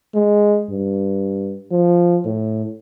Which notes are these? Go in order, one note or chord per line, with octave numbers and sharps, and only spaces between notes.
G#3
G2
F3
A2